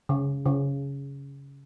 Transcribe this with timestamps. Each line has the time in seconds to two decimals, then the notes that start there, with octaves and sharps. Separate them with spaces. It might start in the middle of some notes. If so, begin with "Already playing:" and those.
0.09 C#3
0.46 C#3